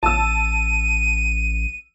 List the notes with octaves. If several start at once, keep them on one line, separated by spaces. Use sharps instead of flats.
A1 A5 E6 D#7